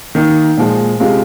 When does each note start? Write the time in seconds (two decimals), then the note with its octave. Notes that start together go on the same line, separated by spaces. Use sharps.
0.15 D#3 A#3 D#4
0.57 A#2 F3 G#3
1.00 C3 G#3 F4